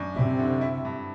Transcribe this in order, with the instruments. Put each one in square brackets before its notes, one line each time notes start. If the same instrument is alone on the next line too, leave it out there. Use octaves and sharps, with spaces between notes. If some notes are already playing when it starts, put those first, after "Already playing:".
Already playing: [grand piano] F#2 D4
[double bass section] C3 [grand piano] E4
[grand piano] D3
E4
G2